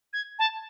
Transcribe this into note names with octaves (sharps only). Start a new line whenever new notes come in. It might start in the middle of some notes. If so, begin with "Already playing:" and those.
G#6
A5